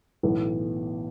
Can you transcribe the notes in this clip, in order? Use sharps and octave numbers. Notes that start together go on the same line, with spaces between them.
B1 A2 E3 B3